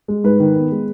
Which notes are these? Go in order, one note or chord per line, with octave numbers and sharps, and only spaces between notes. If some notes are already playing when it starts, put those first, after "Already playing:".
G#3
G#2 B4
D#3
B3
G#3